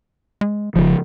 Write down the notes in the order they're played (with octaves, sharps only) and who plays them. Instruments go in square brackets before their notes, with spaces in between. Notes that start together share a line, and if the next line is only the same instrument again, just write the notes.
[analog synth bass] G#3
[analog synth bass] F#1 [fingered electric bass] C#3 F3